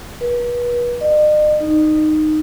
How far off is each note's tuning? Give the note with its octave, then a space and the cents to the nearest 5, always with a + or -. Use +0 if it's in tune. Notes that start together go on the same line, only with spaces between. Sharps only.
B4 -35
D#5 -45
D#4 -10